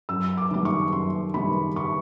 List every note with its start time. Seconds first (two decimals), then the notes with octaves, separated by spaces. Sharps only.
0.09 F#2 E6
0.37 D6
0.51 D#3 G3 D6
0.65 C#6
0.92 F#2 C6
1.34 D#3 G3 B5
1.76 C#6